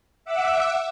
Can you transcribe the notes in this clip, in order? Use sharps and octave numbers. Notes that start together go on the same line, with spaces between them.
E5 F#5 D6 E6